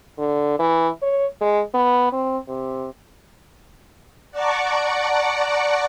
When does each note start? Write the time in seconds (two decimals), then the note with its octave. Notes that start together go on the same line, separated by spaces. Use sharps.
0.18 D3
0.59 E3
1.02 C#5
1.41 G#3
1.74 B3
2.13 C4
2.48 C3
4.31 D5 F#5 A5 A#5 C#6 D6